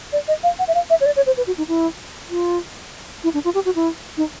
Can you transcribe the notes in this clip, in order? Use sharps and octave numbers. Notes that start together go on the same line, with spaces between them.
D5
D#5
F5
F#5
E5
F5
E5
C#5
D5
C#5
C5
B4
F#4
D#4
E4
F4
E4
D4
F4
G4
F#4
E4
D#4